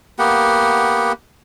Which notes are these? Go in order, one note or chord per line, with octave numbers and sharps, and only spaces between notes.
A#3 B3 G4 F#5